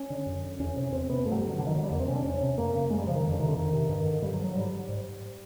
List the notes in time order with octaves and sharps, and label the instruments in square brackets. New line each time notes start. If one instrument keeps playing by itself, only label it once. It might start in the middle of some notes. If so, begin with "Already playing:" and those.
Already playing: [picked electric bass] C#4
D3
F#2
D3
E2 C#4
C3
E2 C4
C3 B3
G2 A3
F#3
G3
D3
F#3
G2 D3
D#3
D3 F#3
G3
E2 A#3
C4
C3 C#4
D4
E2 C#4
C3
F#2 A#3
C#3
F#2 G#3
G3
C#3 F3
D#3
F2
D3
C3 D#3
D3
F2 D#3
C3
G2 D#3
D3
G2 G3
F#3
D3
F#3
G#2 G3
G#2